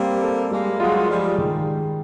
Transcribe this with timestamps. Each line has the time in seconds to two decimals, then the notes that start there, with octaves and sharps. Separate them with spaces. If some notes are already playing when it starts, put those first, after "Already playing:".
Already playing: G3 A#3 C4
0.22 A4
0.51 G3 G#3 A#3
0.80 F#3 G#3 F4
1.09 F3 G3 G#3
1.38 D#3